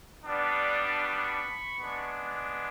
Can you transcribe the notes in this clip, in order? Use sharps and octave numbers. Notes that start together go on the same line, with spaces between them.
G3 B3 D4
B5 C#6
G#3 B3 D4